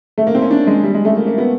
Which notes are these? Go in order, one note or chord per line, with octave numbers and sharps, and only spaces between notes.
A3
A#3
C4
C#4
D4
G#3
G3
G#3
A3
A#3
A#3
B3